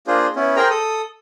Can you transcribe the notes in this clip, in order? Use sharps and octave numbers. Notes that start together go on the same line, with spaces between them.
A#3 D4 F4 G#4 C5
B3 C#4 E4
G#4 A#4 C5 G5 A#5
A4 D#6